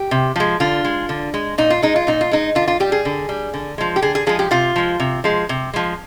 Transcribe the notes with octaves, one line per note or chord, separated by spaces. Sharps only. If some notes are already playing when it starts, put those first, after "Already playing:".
Already playing: G4
C3
F3 G#3
D3 F4
G#3
D3
G#3
A#2 D#4
F4
G#3 D#4
F4
A#2 D#4
F4
G#3 D#4
D3 F4
F4
G3 G4
G#4
D3
G3
D3
F3 G#3
G4
D3 G#4
G#4
F3 G#3 G#4
G4
C3 F4
F3 G#3
C3
F3 G#3
C3
F3 G#3